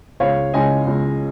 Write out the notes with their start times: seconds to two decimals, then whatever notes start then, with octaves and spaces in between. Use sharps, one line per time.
0.20 C#2 C#5 F5
0.54 C#3 G#3 C#4 D#5 G#5
0.86 C#2